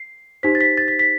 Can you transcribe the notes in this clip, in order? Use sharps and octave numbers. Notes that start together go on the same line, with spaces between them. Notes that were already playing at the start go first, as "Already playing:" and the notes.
Already playing: C7
D#4 G4 C5 B6
A6
B6
A6
B6
B6